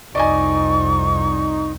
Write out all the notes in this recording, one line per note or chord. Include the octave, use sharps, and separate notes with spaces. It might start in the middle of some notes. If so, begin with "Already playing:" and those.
C2 F2 D#4 D5 D#5 G#5 C#6